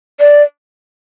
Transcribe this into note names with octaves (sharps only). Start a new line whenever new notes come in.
D5